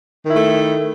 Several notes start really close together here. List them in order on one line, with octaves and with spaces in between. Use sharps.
D#3 E4 A3